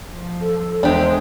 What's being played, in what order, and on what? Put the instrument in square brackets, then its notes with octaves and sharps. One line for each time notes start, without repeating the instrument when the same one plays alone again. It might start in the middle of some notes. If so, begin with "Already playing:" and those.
[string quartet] F3
[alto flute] A4
[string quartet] E2 G#3 [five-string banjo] D4 G4 [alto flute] C5